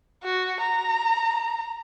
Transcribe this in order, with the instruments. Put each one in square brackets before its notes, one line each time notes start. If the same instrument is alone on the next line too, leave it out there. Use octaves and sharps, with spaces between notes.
[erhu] F#4
A#5